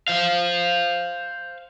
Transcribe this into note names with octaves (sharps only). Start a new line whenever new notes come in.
C5 F5